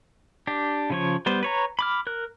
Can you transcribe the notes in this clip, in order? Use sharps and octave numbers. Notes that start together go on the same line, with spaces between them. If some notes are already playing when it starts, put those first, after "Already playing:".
D4 G4
C#3 F3 C#5
G3 B3 C5
B4 C#5 A#5
B5 D6 F6
A#4 F#6